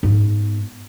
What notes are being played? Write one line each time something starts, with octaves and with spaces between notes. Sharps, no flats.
G#2 B3